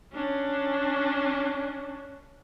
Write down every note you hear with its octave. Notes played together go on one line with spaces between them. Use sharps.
C#4 D4